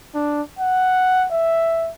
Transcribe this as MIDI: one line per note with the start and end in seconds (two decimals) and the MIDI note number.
0.15 0.42 62
0.59 1.27 78
1.32 1.91 76